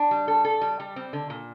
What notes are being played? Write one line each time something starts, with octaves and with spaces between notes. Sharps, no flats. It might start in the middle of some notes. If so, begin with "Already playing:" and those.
Already playing: D4
G3
A4
A4
G3
G3
C4
D3
A#2